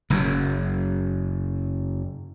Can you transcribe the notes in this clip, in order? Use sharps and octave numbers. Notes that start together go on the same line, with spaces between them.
F#1 F#2